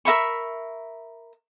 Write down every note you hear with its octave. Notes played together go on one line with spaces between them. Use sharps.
A#4 E5 B5 C#6